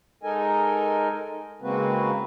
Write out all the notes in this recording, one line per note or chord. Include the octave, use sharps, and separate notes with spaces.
G#3 D#4 A4 A#4 D#5 G#5
C#3 G#3 A#3 C4 F#4 B4